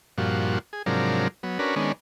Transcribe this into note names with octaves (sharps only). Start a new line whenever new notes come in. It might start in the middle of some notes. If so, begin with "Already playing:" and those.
G2 A#2 F3 F#4
G#4
G#2 C3 F3 F#3 D4 A#4
F#3 B3
C#4 D4 F#4 A#4 B4
D#3 G#3 B3 C#4 D4